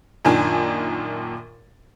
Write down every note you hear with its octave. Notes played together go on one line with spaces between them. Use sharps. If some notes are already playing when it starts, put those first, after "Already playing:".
F#2 A#2 D#3 D4 G#5